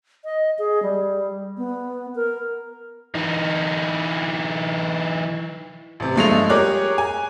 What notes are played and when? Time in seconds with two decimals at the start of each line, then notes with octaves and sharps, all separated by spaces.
0.25 D#5
0.59 G#4
0.83 G3
1.58 B3
2.15 A#4
3.15 E3 D#4
6.00 A1 C3
6.16 G2 F3 G#3 A3 D#5 F7
6.49 G4 G#4 A#4 C#5 D6 F#6
6.98 G#5